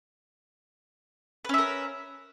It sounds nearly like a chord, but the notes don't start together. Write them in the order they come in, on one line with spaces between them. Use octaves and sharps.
B4 C#4 E5 A#4